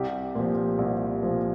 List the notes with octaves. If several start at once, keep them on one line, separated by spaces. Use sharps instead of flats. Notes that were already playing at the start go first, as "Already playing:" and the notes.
Already playing: C2 G4
A#2 F3
C2
A#2 F3